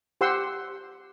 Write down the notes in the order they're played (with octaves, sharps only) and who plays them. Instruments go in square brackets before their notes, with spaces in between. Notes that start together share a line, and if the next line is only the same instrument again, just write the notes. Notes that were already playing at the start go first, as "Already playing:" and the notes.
[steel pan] G4 C5 F#5 C6 E6